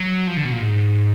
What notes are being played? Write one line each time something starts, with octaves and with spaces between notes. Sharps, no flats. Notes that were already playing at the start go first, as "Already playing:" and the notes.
Already playing: F#3
F3
D3
B2
A#2
G#2